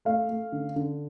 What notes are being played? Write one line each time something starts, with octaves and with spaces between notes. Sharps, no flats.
A3 F5
A3
D3
D3